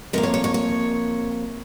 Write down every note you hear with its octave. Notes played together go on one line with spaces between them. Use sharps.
C3 F3 A#3 A#4
C#5
C#5
C#5
C#5